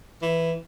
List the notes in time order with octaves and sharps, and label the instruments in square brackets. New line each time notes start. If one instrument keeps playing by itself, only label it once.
[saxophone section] E3